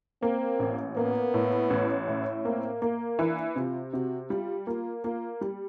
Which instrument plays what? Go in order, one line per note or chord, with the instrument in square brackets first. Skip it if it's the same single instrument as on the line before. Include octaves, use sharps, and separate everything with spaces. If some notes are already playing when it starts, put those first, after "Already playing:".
[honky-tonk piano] A#3 [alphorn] C4
[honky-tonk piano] A1
[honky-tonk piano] A#3 [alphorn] B3
[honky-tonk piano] A2
A1
A2
[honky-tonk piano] A#3 [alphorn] C4
[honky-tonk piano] A#3
[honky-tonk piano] E3 [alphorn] D4
[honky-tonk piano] C3 [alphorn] F4
[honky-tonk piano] C3 [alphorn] F#4
[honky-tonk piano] G3 [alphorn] F4
[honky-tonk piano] A#3 [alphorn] F4
[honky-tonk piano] A#3 [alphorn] F4
[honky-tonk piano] G3